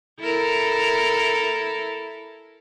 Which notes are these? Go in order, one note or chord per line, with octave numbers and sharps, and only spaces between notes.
E4 A4 A#4